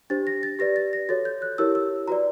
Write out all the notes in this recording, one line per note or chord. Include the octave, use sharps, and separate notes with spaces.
D4 G4 C5 A6
A#6
A6
G4 B4 D5 A#6
A6
A#6
F#4 A4 C#5 A6
G6
F#6
E4 G4 A#4 C#5 E6
E6
F#4 B4 D5 A#5